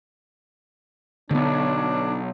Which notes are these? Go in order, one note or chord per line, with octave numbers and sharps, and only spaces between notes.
B1 G2 D3 B3 D4